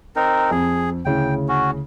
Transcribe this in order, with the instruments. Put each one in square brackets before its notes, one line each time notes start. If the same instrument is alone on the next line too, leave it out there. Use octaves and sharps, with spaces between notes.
[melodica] C4 D#4 A#4
[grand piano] F2 [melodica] G#4
[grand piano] D2 C#3 E4 [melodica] G5
[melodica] C#4 F#4